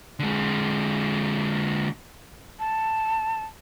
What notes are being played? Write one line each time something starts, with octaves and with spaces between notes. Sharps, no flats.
D3 G#3
A5